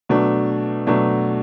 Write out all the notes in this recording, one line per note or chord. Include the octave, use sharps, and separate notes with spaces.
B2 F#3 A3 D4
B2 F#3 A3 D4